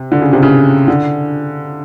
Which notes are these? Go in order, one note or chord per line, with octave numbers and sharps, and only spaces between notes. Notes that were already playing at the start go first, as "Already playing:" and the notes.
Already playing: C3
D3
C#3
C3
C#3
D3